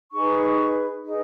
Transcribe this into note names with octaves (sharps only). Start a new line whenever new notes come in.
D#4 G#4 B4 C#6
D#4 G#4 B4